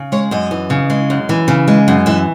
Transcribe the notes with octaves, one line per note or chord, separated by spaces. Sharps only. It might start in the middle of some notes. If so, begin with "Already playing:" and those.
Already playing: C#3
G#3 C#5
F#2 D#5
E3
C#3
G#3
F#2
E3
C#3
G#3
F#2
E3 E5